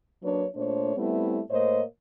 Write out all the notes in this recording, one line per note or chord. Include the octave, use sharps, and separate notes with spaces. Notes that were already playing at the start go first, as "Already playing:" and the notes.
F#3 A#3 D4 B4 C#5
A#2 A3 D4 C5 C#5
G3 A3 B3 C4 E4
A2 A#3 C5 C#5 D#5